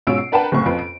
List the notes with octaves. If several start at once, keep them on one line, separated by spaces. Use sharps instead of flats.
G#2 B2 C#4 F4 E6 D7
C7
D4 A#4 B4 F#5 G5 A5
F#1 A2 C#6
F2 F4 B4 D7
D7